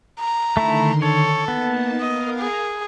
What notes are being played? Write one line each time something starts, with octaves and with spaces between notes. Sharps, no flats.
A#5
D3 D#3 A3 E4 C6
A4 C#5
A#3 B3 D#4 A5
A#4 D#5 F5
G#4